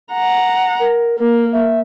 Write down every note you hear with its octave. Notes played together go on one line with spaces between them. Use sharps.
F#5 A#5
A#4
A#3 A#4
E5